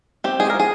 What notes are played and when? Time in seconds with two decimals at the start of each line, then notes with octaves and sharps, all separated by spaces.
0.24 C4 G4
0.40 G#3 G#4
0.50 A#4
0.54 F3
0.60 G#4